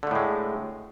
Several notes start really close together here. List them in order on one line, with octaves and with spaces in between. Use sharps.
D3 A3 A2 G#3